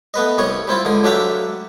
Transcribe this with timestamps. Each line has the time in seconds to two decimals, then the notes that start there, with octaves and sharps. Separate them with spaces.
0.14 A3 B3 B4 D#5
0.38 C2 G3 C#5 C#6 D#6
0.68 G3 C4 E4 F4
0.85 C#2 D3 D#6
1.03 F#3 A3 D4 G4 E5 F5